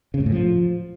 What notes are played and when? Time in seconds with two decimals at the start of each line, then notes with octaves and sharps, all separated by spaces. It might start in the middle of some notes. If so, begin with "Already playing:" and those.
0.14 C#3
0.20 G#2
0.26 A2
0.32 F3